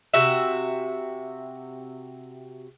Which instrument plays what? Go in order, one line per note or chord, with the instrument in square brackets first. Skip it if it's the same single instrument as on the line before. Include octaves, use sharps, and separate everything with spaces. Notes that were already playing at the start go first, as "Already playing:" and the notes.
[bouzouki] C3 F#4 E5